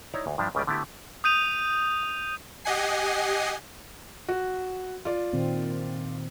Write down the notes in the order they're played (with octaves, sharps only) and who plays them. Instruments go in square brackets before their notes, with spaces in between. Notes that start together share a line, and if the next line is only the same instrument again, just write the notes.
[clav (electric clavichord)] D#4 E4 C#5 D5 A#5
D2
G2 F3 D4 E5
C#2 C#3 G3 B4 D5
D3 A3 B3 E4 G4
[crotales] D#6 G6 D#7 F7
[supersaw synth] G4 D#5 F#5 G#5 C7
[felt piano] F#4
F4 D5
[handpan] A#2 D#3 C4